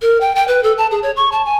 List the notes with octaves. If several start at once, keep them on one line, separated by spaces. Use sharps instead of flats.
A#4
G5
G5
B4
A4
A5
G#4
C#5
C#6
A5
G#5